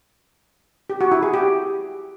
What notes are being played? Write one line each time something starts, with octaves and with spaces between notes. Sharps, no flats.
G4
F#4
E4
G#4
G4